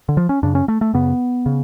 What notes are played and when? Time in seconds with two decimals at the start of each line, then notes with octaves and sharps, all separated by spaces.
0.09 D3
0.17 F3
0.29 C#4
0.43 F#2 C#3 D4
0.55 C#4
0.68 A3
0.81 A3
0.93 F#2 C#3 B3
1.46 C#3